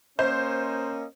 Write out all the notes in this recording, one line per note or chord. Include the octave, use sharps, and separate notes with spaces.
A#3 C#4 C5 D#5